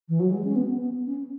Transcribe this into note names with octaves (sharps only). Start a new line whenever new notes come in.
E3
F#3
G#3
C#4
B3
B3
C#4